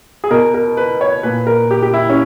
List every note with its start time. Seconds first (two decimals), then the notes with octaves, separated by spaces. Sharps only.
0.24 G#4
0.31 B2 A#4
0.54 A#4
0.77 B4
1.01 C#5
1.23 A#2 B4
1.47 A#4
1.71 G4
1.83 G4
1.94 E4
2.10 C#4